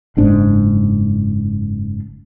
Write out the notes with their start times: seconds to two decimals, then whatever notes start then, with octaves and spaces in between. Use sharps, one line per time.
0.17 F#1 G#2 D4